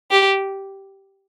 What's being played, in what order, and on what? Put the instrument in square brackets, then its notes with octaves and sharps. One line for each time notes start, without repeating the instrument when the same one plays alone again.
[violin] G4